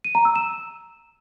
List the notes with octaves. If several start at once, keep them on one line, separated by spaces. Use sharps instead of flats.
D#7
A#5
E6
E7